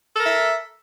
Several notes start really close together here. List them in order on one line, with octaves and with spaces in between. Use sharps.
A4 A#4 E5